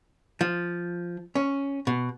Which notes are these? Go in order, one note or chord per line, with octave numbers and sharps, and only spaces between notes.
F3
C#4
B2